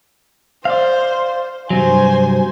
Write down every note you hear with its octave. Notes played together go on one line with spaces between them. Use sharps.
C5 D5 F5
G2 C3 F#3 C5 G#5